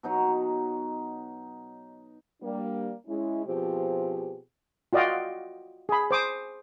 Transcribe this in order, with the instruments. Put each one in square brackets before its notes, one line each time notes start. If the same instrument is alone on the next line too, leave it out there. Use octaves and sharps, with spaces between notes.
[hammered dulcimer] B2 F#3 D#4 A#5
[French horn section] G3 A#3 D4
G#3 C#4 E4
B2 F3 C4 F4 G4 G#4
[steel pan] F4 F#4 D5 D#5 F5 G5
G#4 B5
C5 D6 D#6